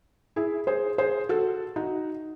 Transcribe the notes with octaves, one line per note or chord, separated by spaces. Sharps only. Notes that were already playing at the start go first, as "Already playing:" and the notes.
E4 G#4
G#4 C5
G#4 C5
F#4 A4
D#4 F#4